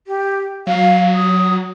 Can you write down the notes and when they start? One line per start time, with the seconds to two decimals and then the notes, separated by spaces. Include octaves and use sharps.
0.07 G4
0.67 F#3 F5
1.14 D#6